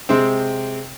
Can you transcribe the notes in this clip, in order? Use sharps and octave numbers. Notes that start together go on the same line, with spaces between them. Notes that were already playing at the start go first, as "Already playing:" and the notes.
C3 G#3 C4